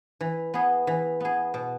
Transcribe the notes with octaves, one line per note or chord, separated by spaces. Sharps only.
E3
B3 G#4
E3
B3 G#4
B2